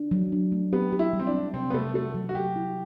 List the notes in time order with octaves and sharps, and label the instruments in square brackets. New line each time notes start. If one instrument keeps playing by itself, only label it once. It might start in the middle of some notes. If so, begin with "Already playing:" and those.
Already playing: [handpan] D4
F#3
D4
A3
[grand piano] B3 [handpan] G4
[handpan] G4
[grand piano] E4
[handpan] G3
[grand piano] C4
D4
[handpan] C4
[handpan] C3 [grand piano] C4
[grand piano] B3
[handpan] C3 [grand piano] A3
[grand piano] A3 [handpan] F#4
[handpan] F#3
[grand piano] F#4
[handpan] F#3 [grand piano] G4
[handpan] E4